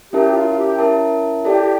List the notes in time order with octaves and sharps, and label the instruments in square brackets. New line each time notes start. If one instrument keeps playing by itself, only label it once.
[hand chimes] C#4 E4 A#4 E5 A5 [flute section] G4
[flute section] F4
G4
[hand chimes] C#4 E4 A#4 E5 A5
[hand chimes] E4 A4 D5 A5 [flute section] G4